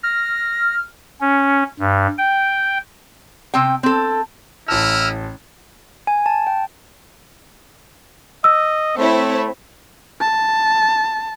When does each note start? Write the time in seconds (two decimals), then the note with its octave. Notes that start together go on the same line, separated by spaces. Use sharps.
0.03 F6 A#6
1.21 C#4
1.79 G2
2.18 G5
3.54 C3 C4 G5
3.83 C4 A4
4.68 A1 E4 D#5 A5 E6 F6
6.07 G#5
6.26 A5
6.47 G5
8.44 D#5 E6
8.97 A3 C4 E4 C#5
10.21 A5